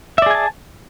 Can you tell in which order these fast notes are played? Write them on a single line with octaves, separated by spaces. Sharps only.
E5 D5 G#4 G#5 A5